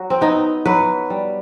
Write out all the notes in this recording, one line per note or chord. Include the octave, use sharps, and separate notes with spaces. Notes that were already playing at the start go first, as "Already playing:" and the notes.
Already playing: F#3 F#4
C4
B3 D#4
F#3 B4
G3